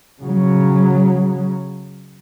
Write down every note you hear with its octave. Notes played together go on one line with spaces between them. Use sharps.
C#3 F#3